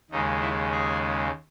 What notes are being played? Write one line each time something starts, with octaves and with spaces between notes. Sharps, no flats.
D#2 C#3 G#3 D#4
E4
G#4